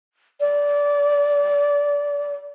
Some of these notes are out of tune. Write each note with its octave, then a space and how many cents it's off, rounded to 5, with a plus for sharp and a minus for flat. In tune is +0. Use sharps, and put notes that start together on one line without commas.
D5 -25